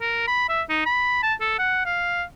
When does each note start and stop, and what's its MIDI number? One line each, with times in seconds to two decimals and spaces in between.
0.01 0.23 70
0.27 0.46 83
0.49 0.62 76
0.70 0.81 63
0.86 1.21 83
1.23 1.34 81
1.41 1.55 69
1.59 1.85 78
1.85 2.23 77